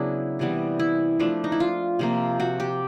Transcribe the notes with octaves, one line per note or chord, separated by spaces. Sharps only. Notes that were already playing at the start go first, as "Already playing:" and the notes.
Already playing: C#3 F#3 B3 D4 E4 G#4
C3 E3 G3 B3
E4
F3 A3 D4
D#4
E4
F4
C3 F3 A#3
F#4
G4